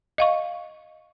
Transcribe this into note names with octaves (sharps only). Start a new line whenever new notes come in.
D#5 F5 C#6